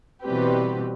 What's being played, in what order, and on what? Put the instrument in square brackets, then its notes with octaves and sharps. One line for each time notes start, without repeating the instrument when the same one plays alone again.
[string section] B2 E3 G3 C4 G4 B4